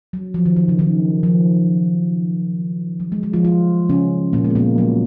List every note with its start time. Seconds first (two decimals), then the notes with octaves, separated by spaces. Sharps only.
0.13 F#3
0.34 F3
0.46 D#3
0.56 D#3
0.68 C#3
0.79 D#3
1.23 F3
3.00 F#3
3.12 G#3
3.23 G#3
3.33 F3 F4
3.44 F3 F4
3.89 C#3 C#4
4.33 A#2 A#3
4.44 G#3
4.50 B3
4.55 A#2 A#3
4.78 F#3